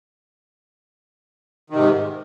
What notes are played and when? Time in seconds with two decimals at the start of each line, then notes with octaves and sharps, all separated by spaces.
1.70 D#3
1.73 C3
1.76 G#2